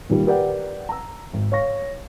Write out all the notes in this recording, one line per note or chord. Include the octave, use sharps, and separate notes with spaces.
A#2 D#3 G3
G4 A#4 B4 D5 F#5 G5
A#5 E6
G#1
C#5 F5 C#6 A#6